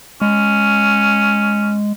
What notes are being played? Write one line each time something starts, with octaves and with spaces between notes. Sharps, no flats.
G#3 C#4